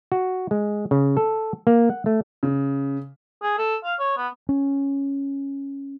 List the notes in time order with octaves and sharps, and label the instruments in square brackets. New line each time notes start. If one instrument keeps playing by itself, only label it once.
[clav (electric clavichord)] F#4
G#3
C#3
A4
A#3
F#5
A3
[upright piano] C#3
[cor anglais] G#4
A4
F5
C#5
B3
[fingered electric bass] C#4